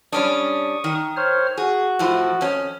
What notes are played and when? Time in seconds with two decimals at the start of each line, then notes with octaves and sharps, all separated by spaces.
0.12 G3 C#4 D4 C#6 D#6
0.84 D#3
1.17 C5 C#5 F6
1.57 F#4 G#4
1.99 A2 F3 E4
2.41 F2 C#4